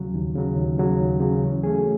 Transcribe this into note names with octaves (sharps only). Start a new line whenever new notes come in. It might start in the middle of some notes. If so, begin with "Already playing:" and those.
Already playing: D#2 C#3 F#3
D#2
C#3 F#3
D#2
C#3 F#3
D#2
C#3 F#3
E3
A3 C#4 G#4